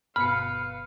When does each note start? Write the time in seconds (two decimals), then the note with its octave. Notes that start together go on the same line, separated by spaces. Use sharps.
0.16 G1 B2 B4 F5 B5 F6 C#7